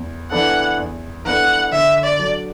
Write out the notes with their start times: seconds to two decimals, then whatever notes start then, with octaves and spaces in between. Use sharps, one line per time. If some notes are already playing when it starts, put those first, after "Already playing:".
Already playing: E2
0.31 E3 B3 D4 A4 F#5
0.78 E2
1.25 E3 B3 D4 A4 F#5
1.72 D3 E5
2.04 D5
2.19 F#3 D4 A4